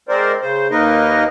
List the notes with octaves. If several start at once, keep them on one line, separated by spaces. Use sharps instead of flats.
G#3 C4 A#4 C5 D5
C#3 C5
D#2 A#3 D#4 A#4 B4 D#5